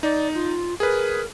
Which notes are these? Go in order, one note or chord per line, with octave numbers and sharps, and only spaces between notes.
D#4 D5
F4
G#4 A#4 B4